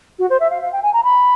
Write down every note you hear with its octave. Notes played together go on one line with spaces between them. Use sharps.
F#4
C5
E5
F5
F5
G5
G#5
A#5
B5